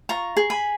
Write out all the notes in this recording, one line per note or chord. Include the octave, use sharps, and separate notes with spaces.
F4 A#5 C#6
G#4
G#5 B5